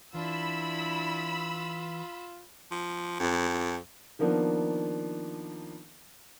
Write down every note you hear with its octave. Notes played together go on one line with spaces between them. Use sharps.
E3 D4 E4 F4 B5 E6
F3
F2
D#3 F3 A#3 B3 D4